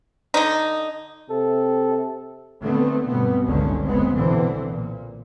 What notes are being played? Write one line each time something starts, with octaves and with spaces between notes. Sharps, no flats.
D3 D#4
C3 A4
D3 D#3 A3 B3 C4
G2 B2 B3 C4
G1 C#2 A#2 D3 D#3 C#4
F#1 F2 G#3 B3 C4
B1 B2 D3 E3 C4
A#2